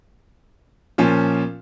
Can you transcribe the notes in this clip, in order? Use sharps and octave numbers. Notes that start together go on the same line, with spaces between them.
A#2 F3 C#4 F4